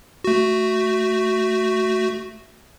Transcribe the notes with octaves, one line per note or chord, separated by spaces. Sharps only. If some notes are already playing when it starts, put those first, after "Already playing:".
A3 F#4